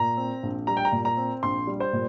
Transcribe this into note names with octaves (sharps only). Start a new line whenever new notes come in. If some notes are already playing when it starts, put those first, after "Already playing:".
Already playing: A#2 A#5
C4
A#1
G3 A#5
G5
A#5
A#2
A#5
C4
A#1 C6
G3
C5
A#2